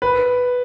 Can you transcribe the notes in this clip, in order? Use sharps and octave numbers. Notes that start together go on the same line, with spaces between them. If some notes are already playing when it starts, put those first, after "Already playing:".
B4